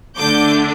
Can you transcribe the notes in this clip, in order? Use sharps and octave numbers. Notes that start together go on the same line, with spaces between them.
D3 A3 D4 D6 G6